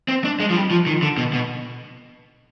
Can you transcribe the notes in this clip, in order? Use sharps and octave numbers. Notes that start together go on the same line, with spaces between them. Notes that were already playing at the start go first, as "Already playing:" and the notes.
C4
D4
G#3
F3
G3
F3
D#3
D3
B2
B2